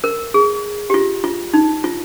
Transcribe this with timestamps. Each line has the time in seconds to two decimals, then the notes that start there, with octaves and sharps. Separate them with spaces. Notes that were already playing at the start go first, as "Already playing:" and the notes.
0.04 A#4
0.34 G#4
0.90 G4
0.94 F4
1.24 F4
1.54 D#4
1.84 F4